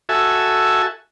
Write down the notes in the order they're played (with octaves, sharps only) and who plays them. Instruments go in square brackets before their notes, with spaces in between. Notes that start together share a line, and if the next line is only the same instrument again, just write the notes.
[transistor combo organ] F#4 A4 E5 G#5